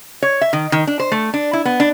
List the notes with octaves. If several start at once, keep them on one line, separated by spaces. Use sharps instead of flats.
C#5
E5
D#3
D#3
D4
C5
A3
D4
E4
B3
D4